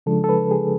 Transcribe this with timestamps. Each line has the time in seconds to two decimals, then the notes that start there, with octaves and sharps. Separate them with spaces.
0.06 C#3 F3 G#3 D4 A4
0.24 A4
0.29 B4
0.51 G#4